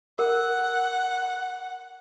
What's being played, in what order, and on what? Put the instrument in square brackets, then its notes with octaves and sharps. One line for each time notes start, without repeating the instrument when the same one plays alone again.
[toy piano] A#4 [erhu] F#5